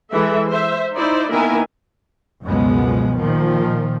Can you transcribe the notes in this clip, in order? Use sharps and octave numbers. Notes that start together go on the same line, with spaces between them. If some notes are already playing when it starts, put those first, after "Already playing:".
E3 G#3 A4 E5
C5 E5
D#4 E4 C5 D5
D#3 A#3 B3 E4 A#4 G#5
C#2 F#2 B2 F3 G#3 B3
A#2 D#3 F3